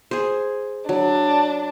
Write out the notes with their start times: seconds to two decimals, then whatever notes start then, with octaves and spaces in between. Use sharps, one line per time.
0.11 G#4 C5
0.89 F#3 D4